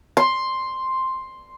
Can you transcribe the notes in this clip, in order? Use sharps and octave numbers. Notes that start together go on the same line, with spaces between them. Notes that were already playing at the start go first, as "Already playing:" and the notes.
C6